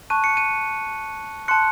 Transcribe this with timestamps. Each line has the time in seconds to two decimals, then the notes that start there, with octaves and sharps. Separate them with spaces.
0.10 A5 C#6 F#6 D#7
0.24 C#7
0.37 D#7
1.48 A5 C6 F#6 C#7